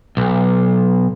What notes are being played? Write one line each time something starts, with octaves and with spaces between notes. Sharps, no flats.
B1